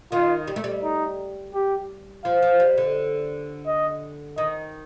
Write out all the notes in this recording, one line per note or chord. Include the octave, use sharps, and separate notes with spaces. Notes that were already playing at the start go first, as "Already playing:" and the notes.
D#3 F4
G3
A3
G3
D#4
G4
F3 F5
F3
G3
D3
D#5
D#3 D#5